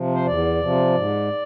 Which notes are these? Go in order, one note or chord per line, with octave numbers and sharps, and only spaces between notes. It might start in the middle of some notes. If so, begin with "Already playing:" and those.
Already playing: C3 F3
C5
E2 D5
C3 F3
G#2